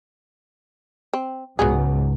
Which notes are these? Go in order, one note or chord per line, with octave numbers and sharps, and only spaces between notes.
C4
C#2 G#2 F#3 B3 G#4